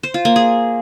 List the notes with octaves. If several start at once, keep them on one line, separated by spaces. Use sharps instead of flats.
C5
F4
A#3
G#4